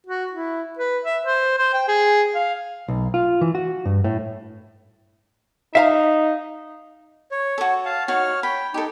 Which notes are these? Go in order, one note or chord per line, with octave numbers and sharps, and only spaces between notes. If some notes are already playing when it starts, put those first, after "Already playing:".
F#4
E4
B4
E5
C5
C5
G5
G#4
F5
B1
F4
E3
F#4
G2
A2
D#4 E5 F5 A#5
C#5
F#4 A4
F5 A5
D#4 F#4 C#5 F6
G5 B5
D#4 G4 A4